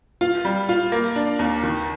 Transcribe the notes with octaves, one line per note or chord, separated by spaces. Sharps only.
F4
G3
F4
A#3
D4
D#2
D#3